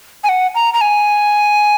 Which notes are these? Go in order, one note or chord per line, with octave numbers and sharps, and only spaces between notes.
G#5
F#5
A#5
A#5
G#5